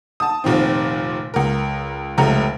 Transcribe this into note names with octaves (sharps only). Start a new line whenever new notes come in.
A5 D#6
F1 A#2 D#3 C4
C#2 A#4
F1 C#2 A3 A#5